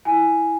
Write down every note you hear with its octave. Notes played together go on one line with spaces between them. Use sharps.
E4 G#5